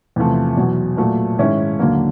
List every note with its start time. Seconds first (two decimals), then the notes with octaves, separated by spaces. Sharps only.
0.16 E2 C3 F3 A3
0.57 E2 B2 F#3
0.97 A#2 F#3 A3
1.39 G#2 D#3 G#3 C#4 E4
1.79 D#2 D3 F#3 A#3